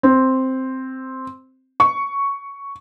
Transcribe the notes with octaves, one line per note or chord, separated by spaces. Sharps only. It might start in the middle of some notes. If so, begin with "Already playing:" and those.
C4
C#6